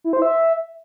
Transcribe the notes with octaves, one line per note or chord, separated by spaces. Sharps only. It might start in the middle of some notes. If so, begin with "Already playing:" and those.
E4
C5
E5